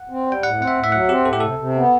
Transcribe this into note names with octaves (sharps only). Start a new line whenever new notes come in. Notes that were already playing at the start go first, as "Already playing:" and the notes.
Already playing: F#5
C4
G3
G5
A2 F#5
C4 F#5
E5
A2
E5
F#3 F#5
C4 G4
A2 A4
G4
C3 A4
C3
B3